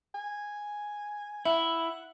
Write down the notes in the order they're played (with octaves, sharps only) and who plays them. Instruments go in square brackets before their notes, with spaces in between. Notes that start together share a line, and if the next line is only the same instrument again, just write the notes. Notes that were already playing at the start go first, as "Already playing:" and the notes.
[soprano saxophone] G#5
[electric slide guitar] E4 [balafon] E5 [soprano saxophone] F#5